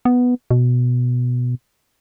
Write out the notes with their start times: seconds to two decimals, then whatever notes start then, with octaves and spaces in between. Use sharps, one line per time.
0.05 B3
0.51 B2